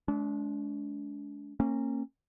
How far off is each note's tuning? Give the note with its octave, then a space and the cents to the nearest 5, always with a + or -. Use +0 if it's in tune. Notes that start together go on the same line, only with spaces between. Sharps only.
G#3 +35 D4 -35
A#3 -20 C#4 -30